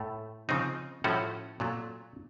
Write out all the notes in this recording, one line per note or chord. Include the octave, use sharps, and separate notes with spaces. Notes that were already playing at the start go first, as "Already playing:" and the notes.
Already playing: A2 A3
C#3 F3 C4 D#4
A2 F3 A3 C#4 F#4
A#2 F#3 A3